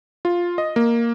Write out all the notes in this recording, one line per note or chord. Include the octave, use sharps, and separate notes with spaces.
F4
D#5
A#3